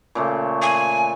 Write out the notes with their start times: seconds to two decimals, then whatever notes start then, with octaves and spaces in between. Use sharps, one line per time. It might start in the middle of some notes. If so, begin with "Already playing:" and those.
0.15 A#2 C#3 A3
0.62 G#5